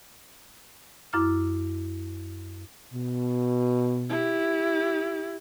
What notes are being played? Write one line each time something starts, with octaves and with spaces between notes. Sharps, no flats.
F#2 E4 D6 F6
B2
E4 G4